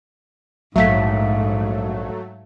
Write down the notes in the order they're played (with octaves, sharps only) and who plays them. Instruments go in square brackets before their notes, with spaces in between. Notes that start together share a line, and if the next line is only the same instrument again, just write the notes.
[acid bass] A#1 [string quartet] G#2 [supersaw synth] F#3 A3 [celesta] E5 F5 B6